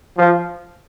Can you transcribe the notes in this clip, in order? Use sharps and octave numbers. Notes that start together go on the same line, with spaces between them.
F3